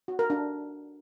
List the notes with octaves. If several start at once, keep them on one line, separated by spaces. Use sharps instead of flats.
F#4
A#4
D4